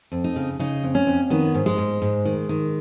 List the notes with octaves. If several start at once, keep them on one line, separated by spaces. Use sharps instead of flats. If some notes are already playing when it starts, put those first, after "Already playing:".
F2
D#4
C#3
C#3 D#4
F2
C#4
F2
D#3 B3
G#2
G#3
G#2
G#2
D#3
D#3